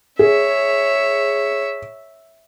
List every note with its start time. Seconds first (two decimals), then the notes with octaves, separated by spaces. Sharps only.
0.19 G#4 C#5 E5